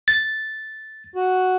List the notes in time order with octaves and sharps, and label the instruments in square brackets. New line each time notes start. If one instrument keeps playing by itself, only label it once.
[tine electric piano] A6
[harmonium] F#4